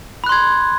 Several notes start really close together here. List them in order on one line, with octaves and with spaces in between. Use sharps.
B5 F#6 C6 G#6